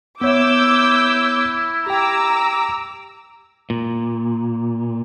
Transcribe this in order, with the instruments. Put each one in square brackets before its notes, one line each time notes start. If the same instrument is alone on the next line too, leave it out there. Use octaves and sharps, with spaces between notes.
[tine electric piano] B3 C#5 E5 [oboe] E4 [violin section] D6 E6 G6
[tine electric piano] G4 G5 [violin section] A#5 D6 E6
[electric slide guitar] A#2